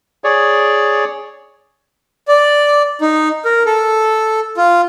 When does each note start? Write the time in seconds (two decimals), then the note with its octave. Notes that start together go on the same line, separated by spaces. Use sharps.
0.24 G#4 C#5 D5
2.28 D5
3.01 D#4
3.45 A#4
3.66 A4
4.57 F4